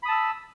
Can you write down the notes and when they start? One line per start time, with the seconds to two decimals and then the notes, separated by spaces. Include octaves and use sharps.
0.03 B5
0.05 D#6
0.08 A5
0.11 E6